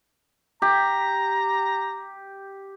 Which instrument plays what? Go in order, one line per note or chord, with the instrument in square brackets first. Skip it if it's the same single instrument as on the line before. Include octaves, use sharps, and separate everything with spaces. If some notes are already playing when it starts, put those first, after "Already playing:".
[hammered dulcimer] G4 [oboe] A#5